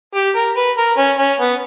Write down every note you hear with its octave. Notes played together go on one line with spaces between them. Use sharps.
G4
A#4
B4
A#4
C#4
C#4
B3